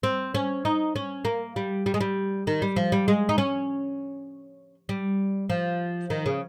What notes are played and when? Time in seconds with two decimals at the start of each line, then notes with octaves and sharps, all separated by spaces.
0.03 C4
0.35 C#4
0.65 D#4
0.96 C#4
1.25 A#3
1.56 G3
1.86 G3
1.94 G#3
2.01 G3
2.47 D#3
2.62 G3
2.76 F3
2.92 G3
3.08 G#3
3.29 D#4
3.38 C#4
4.89 G3
5.50 F3
6.10 D#3
6.26 C#3